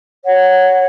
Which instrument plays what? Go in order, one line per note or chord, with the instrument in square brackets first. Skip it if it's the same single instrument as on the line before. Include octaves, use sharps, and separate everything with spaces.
[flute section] C#5 F#5